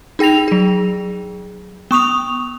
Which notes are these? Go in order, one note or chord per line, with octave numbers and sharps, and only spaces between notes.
D#4 G#4 G5 A#6 F7
F#3 G#4
B3 C#6 D#6 F7